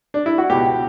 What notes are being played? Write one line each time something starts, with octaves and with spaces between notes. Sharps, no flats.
D4
E4
F#4
C#2 B2 G4